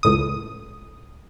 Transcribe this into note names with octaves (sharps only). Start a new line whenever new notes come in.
C#2 A2 D#6